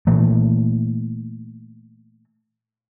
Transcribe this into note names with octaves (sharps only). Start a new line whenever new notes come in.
A#2 E3 A3